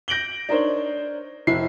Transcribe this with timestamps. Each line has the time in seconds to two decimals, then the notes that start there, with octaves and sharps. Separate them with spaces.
0.08 G6 A#6 D7 F#7 G7
0.49 D4 D#4 A#4 C5 C#5
1.47 F1 E4 C7